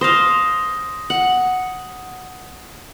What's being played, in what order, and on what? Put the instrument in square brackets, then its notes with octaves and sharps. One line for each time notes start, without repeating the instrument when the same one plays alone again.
[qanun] C5 F5 [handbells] D#6 A#6
[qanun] F#5